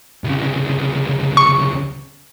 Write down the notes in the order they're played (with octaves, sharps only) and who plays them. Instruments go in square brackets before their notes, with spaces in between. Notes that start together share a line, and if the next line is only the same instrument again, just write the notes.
[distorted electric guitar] C2 C#3
[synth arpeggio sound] C#6